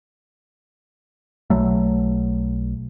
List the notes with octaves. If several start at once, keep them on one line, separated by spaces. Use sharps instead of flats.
B1 F#3 A3